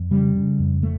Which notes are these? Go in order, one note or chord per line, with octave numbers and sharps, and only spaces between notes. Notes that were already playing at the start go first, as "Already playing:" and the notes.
Already playing: F2
C#3 G3
C#3
F2
A3